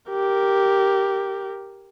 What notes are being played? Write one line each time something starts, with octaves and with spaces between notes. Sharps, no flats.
G4 A#4